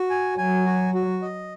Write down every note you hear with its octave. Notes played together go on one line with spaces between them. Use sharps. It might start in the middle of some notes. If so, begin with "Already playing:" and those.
Already playing: F#4
G#5
F#3 G#5
F#4
F#4
D#5